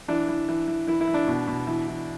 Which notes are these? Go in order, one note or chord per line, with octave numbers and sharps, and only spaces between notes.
E3 D4
E3
E3
E3
E3 E4
E4
E3
D4
B2
B2
E3
E3